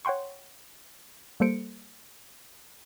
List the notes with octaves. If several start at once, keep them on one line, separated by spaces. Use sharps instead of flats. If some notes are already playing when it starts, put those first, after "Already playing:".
C#5 F#5 G5 C6 C#6
G3 A#3 A4 C5 C#7 D7